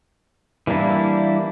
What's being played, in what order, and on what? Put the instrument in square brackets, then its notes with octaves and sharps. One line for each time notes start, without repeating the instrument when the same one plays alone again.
[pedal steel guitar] E3 G3 A#3 D4 E4